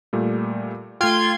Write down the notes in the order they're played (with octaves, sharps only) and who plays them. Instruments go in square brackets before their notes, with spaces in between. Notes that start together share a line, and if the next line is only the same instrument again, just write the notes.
[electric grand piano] A#2 G3 A3
[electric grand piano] A3 G5 [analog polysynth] F4 C6 G#6